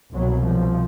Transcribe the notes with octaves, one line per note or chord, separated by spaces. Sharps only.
C2 B2 F#3
F3